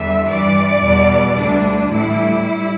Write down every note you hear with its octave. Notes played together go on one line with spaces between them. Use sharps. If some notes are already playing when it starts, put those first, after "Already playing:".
Already playing: E2 D3 G3 E5
G2 E3 G3 D5
E2 B2 G3
D2 D3 G3 D4
A2 E3 G3 E4
G3